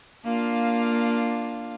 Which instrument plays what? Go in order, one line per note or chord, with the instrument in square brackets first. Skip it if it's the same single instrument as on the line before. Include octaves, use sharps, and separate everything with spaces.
[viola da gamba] A#3 D4 F4